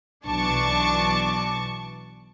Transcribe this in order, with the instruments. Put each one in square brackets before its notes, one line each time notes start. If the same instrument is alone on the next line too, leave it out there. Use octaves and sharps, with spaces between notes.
[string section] B1 E3 D4 A5 C#6 D6